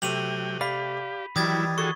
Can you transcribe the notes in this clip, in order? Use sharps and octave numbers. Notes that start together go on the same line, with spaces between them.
C3 F#3 A3 G5 D#7 F7 F#7
G4 D5 F5 B5 B6
D#3 E3 F#3 G3 E4 D#6 G#6 A6
F#4 G#4 A4 C#6